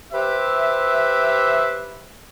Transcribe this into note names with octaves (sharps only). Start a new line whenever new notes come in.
G4 B4 C5 E5